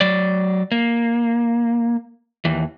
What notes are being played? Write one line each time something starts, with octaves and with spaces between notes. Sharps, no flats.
F#3 D5
A#3
D#2 E3